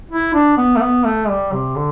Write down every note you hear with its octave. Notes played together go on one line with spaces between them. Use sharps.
E4
D4
B3
A3
B3
A3
G3
C3
D3